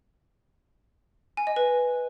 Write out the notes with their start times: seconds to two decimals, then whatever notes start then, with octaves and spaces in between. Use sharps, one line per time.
1.37 G#5
1.47 D#5
1.56 B4